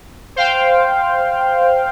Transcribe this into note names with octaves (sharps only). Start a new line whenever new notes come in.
C5 F5 G5